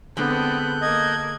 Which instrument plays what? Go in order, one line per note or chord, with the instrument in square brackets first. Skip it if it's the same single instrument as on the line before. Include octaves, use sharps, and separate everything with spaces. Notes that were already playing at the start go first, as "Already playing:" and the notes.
[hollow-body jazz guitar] D3 G#3 [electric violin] B3 C4 [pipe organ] A4 F#6 G6
[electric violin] A#3 G#6 [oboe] D#5